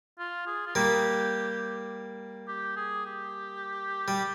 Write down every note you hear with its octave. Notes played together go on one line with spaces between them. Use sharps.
F4
G#4
F4
G3 A#3 G4
G4
G#4
G4
G3